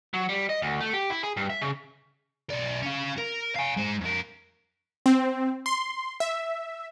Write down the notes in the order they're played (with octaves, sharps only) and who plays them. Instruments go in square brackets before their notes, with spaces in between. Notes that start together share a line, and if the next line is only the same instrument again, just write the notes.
[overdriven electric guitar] F#3
G3
D#5
D2
A3
G4
E4
G#4
G2
E5
C#3
[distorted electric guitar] B1 D5
C#4 F5
A#4
F5 G#5
G#3 C5
F2 A#4
[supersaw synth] C4
C6
E5